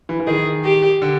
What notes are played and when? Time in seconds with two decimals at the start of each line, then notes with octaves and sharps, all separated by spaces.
0.09 E3
0.20 E3
0.27 D#3 G#4
0.64 G4
1.02 D3